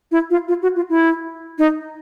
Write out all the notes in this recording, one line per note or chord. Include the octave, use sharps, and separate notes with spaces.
E4
F4
F4
F#4
F4
E4
D#4